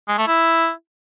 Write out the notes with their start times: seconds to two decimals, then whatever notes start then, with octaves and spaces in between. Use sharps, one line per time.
0.08 G#3
0.18 A3
0.27 E4